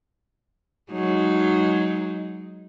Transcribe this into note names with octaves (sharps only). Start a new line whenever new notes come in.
F#3 G#3 D#4